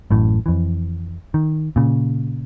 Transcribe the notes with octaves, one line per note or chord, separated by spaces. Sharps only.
A1 F#2 A2
F2 E3
D#3
A#2 C#3